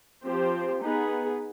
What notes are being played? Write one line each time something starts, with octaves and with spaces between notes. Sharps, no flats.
F3 C4 G4 C5
B3 D#4 G#4 B4